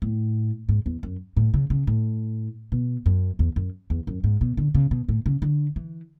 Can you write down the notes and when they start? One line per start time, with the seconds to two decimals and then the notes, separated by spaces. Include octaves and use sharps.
0.02 A2
0.69 G#2
0.86 E2
1.03 F#2
1.37 A2
1.54 C#3
1.70 C#3
1.87 A2
2.72 B2
3.06 F#2
3.39 E2
3.56 F#2
3.90 E2
4.07 F#2
4.24 G#2
4.41 B2
4.57 D3
4.74 C#3
4.91 B2
5.09 A2
5.26 C#3
5.42 D3
5.76 E3